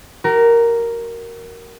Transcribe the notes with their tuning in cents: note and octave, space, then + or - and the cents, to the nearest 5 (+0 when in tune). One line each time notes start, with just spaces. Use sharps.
F#4 +40 A#4 +0